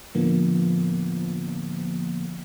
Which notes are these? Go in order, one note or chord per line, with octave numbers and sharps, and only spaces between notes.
A2 D3 F3 A#3 B3